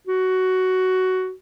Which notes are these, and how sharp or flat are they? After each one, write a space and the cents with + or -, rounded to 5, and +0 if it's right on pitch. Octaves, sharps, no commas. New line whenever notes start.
F#4 +10